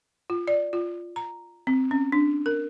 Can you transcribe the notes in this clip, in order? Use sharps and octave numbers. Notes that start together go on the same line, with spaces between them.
F4
D5
F4
A#5
C4
C#4
D4
A#4